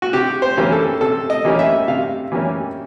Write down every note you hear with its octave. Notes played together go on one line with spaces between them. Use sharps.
F#4
C3 G4
C5
E3 G3 A#3 C#4
A4
C3 A4
D#5
E3 G3 A#3 C#4
E5
C3 F5
E3 G3 A#3 C#4